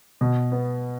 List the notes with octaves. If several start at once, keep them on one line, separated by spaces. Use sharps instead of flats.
B2
B3